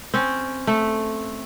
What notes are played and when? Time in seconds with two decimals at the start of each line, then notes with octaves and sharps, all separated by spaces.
0.14 C4 C#4
0.67 A3